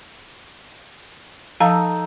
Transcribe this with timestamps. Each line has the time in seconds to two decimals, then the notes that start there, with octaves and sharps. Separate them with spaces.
1.60 F3 D#4 A4 F5 A#5